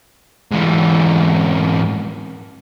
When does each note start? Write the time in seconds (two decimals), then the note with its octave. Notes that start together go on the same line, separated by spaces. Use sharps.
0.51 G#2 E3